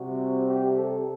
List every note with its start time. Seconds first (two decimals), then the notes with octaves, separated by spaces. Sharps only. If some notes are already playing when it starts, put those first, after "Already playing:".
Already playing: C3 G3 C4 F#4
0.44 G4
0.73 A4